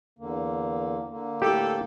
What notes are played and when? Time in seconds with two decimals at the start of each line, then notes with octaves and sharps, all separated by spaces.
0.19 E2 D3 A#3
1.11 D3 A#3
1.42 A2 G4 A4